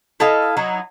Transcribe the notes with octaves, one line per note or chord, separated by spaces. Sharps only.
E4 A4 D#5 F5
F#3 D#4 E4